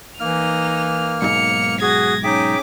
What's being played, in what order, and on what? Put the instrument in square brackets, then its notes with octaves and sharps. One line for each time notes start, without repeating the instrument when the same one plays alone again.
[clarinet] E3 [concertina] A#3 F6 [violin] D#4 F7
[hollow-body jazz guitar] B1 G#2 [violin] C#7 F7
[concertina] F#4 [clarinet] G#4 [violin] G#6 A#6
[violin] C#4 D6 [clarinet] D#4 [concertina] G#4 E5 G5